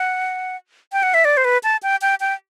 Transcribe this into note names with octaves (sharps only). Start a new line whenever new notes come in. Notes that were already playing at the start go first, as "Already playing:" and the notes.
Already playing: F#5
G5
F#5
E5
D5
C5
B4
A5
G5
G5
G5